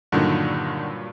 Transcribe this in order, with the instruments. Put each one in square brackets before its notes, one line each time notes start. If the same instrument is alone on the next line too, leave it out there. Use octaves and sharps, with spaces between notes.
[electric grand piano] G2 A#2 F#3 [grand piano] D3 D#3